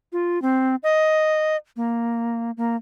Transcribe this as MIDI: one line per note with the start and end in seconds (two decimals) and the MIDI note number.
0.13 0.41 65
0.42 0.76 60
0.83 1.56 75
1.76 2.51 58
2.57 2.76 58